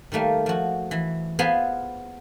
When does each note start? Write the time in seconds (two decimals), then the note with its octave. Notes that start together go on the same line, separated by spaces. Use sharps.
0.12 D#3 G3 A3 A#3
0.46 F3 F#4
0.91 E3
1.39 B3 F4 G#4 B4 C5 G#5